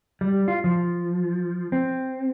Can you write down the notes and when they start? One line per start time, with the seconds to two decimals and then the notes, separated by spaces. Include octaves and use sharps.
0.21 G3
0.48 F4
0.64 F3
1.72 C4